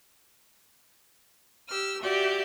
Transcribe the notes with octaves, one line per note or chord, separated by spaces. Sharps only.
G4 E6 F6
F#4 G4 D5 E5